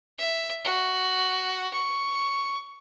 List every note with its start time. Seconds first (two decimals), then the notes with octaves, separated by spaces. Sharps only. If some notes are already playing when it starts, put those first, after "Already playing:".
0.18 E5
0.64 F#4
1.73 C#6